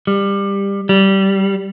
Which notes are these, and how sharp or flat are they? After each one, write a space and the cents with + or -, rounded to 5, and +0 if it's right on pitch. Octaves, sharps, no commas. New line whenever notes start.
G3 +20
G3 -15